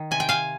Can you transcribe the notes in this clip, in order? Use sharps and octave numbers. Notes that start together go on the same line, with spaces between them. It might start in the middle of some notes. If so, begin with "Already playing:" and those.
Already playing: D#3
C3 G#5
G5
F5 G#5